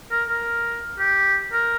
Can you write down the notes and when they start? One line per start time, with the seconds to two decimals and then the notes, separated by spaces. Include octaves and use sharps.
0.11 A#4
0.29 A#4
0.99 G4
1.53 A#4